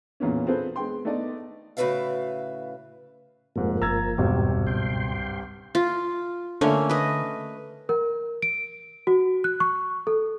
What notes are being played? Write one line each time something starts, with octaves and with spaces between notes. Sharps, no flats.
E2 A#2 B3 C#4
C4 F4 G#4 A4 B4 C5
G#3 B3 G5 C6
A3 B3 D#4 D5 D#5
A2 C#3 F#4 B4 E5 F5
F1 G#2 F3 A#3
G1 A#5 E6 G#6 A6
G#1 E2 G2 B2 G4
C#2 G5 C6
F4
D3 A3 A#3 C#4
B4 D#5
A#4
D7
F#4
F#6
C#6
A4